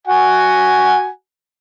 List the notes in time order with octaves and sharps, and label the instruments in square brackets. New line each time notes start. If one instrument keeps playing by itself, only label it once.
[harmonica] F#4 F#5 G#5